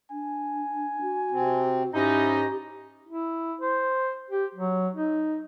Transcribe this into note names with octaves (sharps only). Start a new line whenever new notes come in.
D4 G#5
F#4
C3 C4
G#2 C#4 D#4 E4 G4 D#5
E4
C5
G4
F#3
D#4